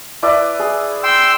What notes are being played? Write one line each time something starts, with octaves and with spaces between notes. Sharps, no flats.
E4 B4 D5
G#4
G5 C6 E6